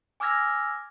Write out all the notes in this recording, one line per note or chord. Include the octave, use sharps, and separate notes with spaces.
G#5 D6 E6 F6 G#6 A#6